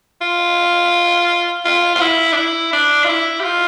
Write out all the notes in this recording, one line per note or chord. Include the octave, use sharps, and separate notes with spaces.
F4
F4
F4
E4
D4
E4
D4
F4
E4
G4
F4